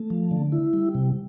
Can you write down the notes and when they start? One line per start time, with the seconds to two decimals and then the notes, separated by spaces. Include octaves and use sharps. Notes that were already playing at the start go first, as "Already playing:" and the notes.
Already playing: A3
0.10 F3
0.31 D3
0.52 E4
0.73 G3
0.95 C3